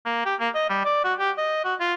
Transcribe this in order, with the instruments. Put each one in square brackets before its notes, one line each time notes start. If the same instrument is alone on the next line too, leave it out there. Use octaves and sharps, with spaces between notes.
[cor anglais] A#3
G4
A#3
D#5
G3
D5
F#4
G4
D#5
F#4
F4